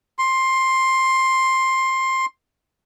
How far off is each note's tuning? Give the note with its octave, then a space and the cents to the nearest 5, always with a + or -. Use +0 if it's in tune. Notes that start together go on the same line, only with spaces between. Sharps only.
C6 +10